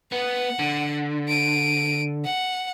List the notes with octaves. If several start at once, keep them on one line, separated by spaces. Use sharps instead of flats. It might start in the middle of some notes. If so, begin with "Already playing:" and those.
B3 F#5
D3
D7 D#7
F#5